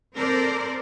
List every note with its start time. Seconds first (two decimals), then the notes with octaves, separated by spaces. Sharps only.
0.14 C4 A4 A#4 C5 D5